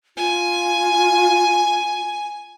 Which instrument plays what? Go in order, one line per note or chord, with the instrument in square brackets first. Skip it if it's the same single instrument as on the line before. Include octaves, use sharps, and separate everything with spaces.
[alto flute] F4 [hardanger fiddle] G#5